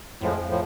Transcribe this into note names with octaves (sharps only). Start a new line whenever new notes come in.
F2 A2 F3 G#3
A2 F3